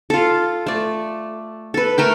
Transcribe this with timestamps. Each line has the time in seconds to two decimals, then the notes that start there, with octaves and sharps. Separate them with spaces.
0.10 F4 A4
0.67 A3 D5
1.74 A4 B4
1.98 A3 A#4 G5